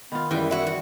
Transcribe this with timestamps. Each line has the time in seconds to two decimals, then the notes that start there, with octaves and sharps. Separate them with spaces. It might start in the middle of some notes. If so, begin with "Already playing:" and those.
0.12 D#3 B3 F4
0.31 F#2 E3 G3 G#3 B4 G5
0.51 E4 F#4
0.67 F#4